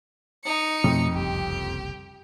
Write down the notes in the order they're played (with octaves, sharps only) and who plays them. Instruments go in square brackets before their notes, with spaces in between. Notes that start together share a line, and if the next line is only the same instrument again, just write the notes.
[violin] D#4 C#7
[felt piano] F2 [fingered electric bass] B2 A3
[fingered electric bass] F#1 C2 [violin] G4